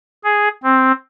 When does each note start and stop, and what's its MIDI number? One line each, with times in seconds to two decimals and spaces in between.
0.24 0.48 68
0.64 0.92 60